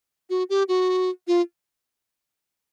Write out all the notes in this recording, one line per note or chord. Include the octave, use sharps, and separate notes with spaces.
F#4
G4
F#4
F4